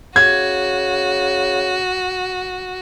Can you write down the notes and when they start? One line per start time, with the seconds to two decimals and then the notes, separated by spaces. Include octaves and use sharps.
0.16 C#3 F#4 G#6